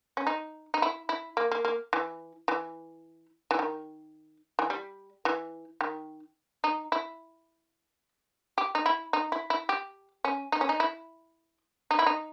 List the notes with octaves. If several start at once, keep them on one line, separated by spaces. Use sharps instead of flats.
C#4
D#4
D#4
E4
E4
A#3
A#3
A#3
E3
E3
E3
D#3
E3
G3
E3
D#3
D#4
E4
G4
D#4
E4
D#4
E4
E4
G4
C#4
D#4
C#4
D#4
E4
D#4
E4
D#4